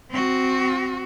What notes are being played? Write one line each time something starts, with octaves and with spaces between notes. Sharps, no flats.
C4 F#4